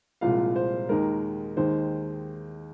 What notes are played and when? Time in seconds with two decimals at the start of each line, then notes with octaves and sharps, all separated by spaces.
0.21 C2 A#2 F3 G#3 F4 F5
0.56 C5
0.89 D#2 D#3 G#3 A#4
1.57 D#2 D#3 G#3 C5